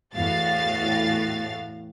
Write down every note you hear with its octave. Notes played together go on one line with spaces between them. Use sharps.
E2 A2 F#4 F5 A6